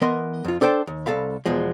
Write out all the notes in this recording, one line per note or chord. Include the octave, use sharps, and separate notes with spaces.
E3 B3 A#4 D#5 C6
F2 F4
D4 A4 C5 G5
D#2
C2 A4 F5 B5
E2 B2 F3 G#3